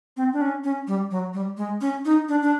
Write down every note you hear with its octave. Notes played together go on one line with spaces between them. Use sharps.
C4
D4
C#4
C#4
G3
F#3
G3
G#3
C#4
D#4
D4
D4